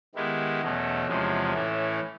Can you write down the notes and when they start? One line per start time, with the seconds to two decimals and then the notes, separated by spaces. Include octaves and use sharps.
0.15 D#3 G#3 B3 E4 G4
0.61 E2 B2 F#3 A3 C#4
1.07 E2 C3 F3 G#3 C#4
1.53 A2 E3 A3 C#4